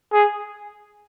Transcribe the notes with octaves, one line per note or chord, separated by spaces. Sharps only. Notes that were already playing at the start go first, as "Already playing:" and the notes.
G#4